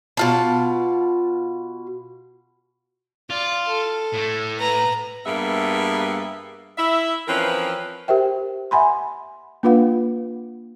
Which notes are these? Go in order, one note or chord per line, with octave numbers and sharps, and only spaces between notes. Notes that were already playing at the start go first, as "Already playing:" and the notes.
B2 F4 A5
F4 D5
A4
A2 A3
B4 A#5
G2 G3 A#3 B3 G#4 E5
E4 E5
E3 F3 C4 C#4 A#4 B4
G4 A#4 C5 E5 G5
E5 F#5 G#5 B5 C6
A#3 D4 F4 B4 F5 F#5